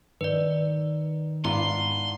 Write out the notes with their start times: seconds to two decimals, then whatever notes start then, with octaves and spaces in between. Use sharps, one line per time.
0.21 D#3 B4 D5
1.45 G#2 B3 D4 E4 F5 A#5 C6